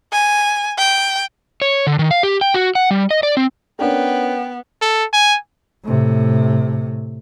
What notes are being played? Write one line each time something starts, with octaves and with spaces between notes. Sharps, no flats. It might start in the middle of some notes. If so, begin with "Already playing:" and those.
G#5
G5
C#5
D3
D#3
F5
G4
G5
F#4
F#5
G3
D#5
D5
C4
B3 C#4 D4 A#4 G5
A4
G#5
A2 C3